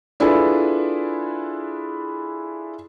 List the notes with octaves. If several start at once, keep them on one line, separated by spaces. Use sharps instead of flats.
D4 E4 F4 G#4 A4 B4